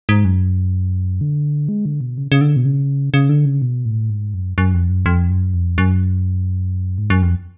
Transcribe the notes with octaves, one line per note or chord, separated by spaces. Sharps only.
G#2
F#2
D3
G#3
D3
B2
C#3
C#3
D3
B2
C#3
C#3
D3
C#3
B2
A2
G#2
F#2
F#2
F2
F#2
F2
F#2
F2
F#2
G#2
F#2
F2